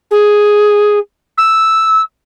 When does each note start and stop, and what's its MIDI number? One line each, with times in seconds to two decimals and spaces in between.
0.11 0.99 68
1.38 2.01 88